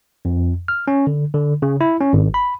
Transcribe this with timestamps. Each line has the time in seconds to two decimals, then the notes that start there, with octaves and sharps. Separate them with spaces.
0.25 F2
0.68 F6
0.88 C#4
1.07 D3
1.34 D3
1.62 C#3
1.81 E4
2.01 C#4
2.13 G#1
2.34 B5